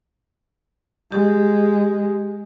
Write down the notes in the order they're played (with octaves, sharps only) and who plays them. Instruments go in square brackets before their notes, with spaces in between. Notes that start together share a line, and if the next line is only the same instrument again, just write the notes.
[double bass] G#3 [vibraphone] G4